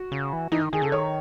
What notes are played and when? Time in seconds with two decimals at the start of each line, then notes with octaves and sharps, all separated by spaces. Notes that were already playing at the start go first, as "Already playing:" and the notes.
Already playing: F#4
0.12 C#3
0.33 E3
0.52 E3 D#4
0.62 D#3
0.73 D#3 G#4
0.82 C#3 A4
0.92 D#3 C#5